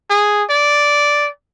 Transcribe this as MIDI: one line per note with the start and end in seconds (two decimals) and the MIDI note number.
0.10 0.43 68
0.50 1.29 74